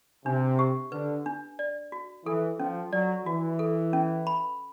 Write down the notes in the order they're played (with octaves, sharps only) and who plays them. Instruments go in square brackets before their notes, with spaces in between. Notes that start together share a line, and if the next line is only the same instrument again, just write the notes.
[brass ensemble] C3 [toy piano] D4
[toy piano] G4
[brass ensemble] D3 [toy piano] B4
[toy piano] D4
D5
F#4
[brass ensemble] E3 [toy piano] A4
[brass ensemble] F3 [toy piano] C#4
[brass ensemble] F#3 [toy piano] D5
[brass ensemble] E3 [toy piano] F#4
[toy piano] A4
C#4
B5